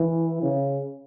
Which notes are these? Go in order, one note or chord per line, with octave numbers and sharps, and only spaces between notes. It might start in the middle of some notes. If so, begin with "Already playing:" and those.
Already playing: E3
C#3